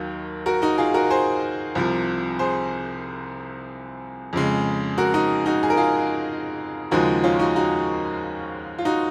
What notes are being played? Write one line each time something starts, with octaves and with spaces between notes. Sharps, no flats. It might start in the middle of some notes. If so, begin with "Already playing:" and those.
Already playing: D#2 D#3 F#3
F#4 A#4
D#4 F#4
F4 G#4
F#4 A#4
G#4 C5
C2 C3 F3
G#4 C5
F2 C#3 G#3
F#4 A#4
D#4 F#4
D#4 F#4
G#4
A#4
F4 G#4
D#2 C#3 F3 G#3 D#4 F#4
C#4 F4
D#4 F#4
D#4 F#4
F4
D#4 F#4